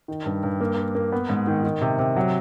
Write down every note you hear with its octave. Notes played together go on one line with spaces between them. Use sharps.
D#3
G2
G2
A#3
A#3
A#3
B3
G#2
D#3
D#3
C3
C3
F#3